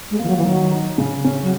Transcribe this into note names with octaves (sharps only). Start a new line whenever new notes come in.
G#3
E3 A#3
F#3
E3
D#3 F#3
D#4
C#3
C#4
F#3